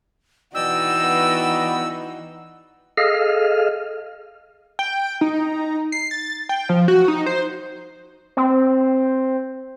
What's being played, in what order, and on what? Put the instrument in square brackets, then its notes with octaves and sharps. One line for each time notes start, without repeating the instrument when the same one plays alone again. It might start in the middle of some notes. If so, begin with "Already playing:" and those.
[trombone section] B2 [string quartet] E3 D#4 F#4 [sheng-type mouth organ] D5 D#5 G5 [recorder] E6
[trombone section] B3
[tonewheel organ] G#4 A4 D#5 F5 F6
[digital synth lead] G5
D#4
C7
A6
G5
F3
F#4
D#4
C5
[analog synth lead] C4